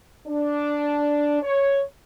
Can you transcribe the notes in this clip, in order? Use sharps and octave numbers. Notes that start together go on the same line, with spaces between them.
D4
C#5